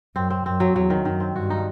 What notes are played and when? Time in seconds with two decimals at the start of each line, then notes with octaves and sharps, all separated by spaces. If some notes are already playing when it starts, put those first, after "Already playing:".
0.16 F#2 C4
0.30 C4
0.45 F#2 C4
0.60 F#3
0.75 E2 F#3
0.90 D#3
1.05 F#2 D#3
1.20 C4
1.35 G2 F#4
1.50 D#4